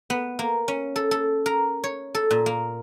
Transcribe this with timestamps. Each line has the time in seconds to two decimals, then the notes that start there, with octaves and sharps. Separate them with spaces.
0.10 B3
0.39 A#3
0.68 C#4
0.96 A4
1.11 A4
1.46 A#4
1.84 C#5
2.15 A4
2.31 A#2
2.46 A#3